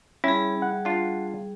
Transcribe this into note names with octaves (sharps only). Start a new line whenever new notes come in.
G3 C#4 E4 G#4
F#5
D4 F4